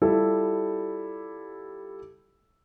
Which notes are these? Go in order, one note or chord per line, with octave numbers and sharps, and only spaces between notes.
G3 E4 F4 G4 A4